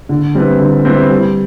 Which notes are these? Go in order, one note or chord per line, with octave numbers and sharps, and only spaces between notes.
D3
G3 C4 E4 B4
D3
G3 C4 E4 B4
G3